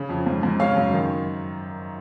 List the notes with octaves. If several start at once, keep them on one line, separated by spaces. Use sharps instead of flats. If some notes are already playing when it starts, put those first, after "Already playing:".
Already playing: C#3
F2
G#2
G#2
C#3 C#5 F5
F#2
D#3